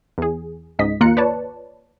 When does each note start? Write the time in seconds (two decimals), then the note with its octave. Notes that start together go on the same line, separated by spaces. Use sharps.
0.18 E2 G#4
0.79 C#2 G#2 D#5 B6
1.00 D#2 A#3 F4 A#5 F#6 C#7
1.17 B4 C#5 D5 A5